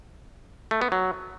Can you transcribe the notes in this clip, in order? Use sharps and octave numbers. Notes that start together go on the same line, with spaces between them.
A3
B3
F#3